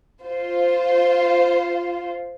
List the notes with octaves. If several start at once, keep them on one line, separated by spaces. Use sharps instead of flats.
F4 C5